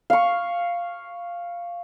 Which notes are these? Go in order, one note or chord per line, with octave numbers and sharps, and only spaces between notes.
F5 C#6